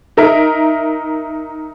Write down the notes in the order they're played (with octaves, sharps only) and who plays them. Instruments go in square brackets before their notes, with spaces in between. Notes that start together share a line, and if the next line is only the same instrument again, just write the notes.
[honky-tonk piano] D#4 A#4 E5